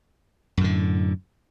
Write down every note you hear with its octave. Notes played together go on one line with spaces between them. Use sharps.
F#2 A2 D3